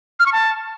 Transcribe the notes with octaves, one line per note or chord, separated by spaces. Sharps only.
F6
C#6
A5